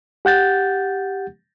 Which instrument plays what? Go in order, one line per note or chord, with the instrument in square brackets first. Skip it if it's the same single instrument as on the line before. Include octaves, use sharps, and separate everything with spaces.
[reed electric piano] G4 F#5 G6 A6